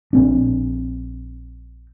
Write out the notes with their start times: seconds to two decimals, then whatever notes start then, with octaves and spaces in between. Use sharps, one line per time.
0.13 A#1 C4 D4